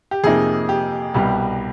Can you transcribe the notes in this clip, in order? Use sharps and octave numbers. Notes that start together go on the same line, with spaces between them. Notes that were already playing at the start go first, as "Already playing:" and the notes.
G4
F2 C3 F3 A#3 D#4 G#4
G4
C2 B2 G3